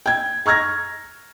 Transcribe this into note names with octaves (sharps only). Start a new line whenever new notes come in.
G5 G#6
A#5 C#6 F6 G#6 A#6